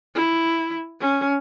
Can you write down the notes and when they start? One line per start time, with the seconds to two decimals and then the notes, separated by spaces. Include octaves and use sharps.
0.15 E4
1.00 C#4